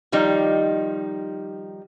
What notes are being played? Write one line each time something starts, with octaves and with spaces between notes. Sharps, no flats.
D#3 F3 G3 D#4